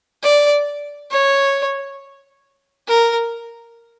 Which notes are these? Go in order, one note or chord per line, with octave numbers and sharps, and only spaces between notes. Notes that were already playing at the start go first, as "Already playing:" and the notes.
D5
C#5
A#4